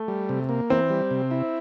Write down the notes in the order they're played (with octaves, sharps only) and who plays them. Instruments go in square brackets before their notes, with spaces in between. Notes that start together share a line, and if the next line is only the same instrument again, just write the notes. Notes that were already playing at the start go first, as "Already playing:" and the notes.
Already playing: [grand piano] A3
[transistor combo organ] G3
C3
A#3
[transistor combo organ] E3 [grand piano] C4
[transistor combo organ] G3
C3
E4